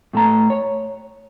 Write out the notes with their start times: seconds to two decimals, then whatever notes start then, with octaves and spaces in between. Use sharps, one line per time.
0.13 A2 A3 A5 A#5
0.50 C#5